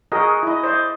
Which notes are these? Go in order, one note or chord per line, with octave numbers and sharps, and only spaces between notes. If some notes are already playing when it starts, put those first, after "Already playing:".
F#4 G#4 A#4 D#5
E4 D#5
C5 D5 D#5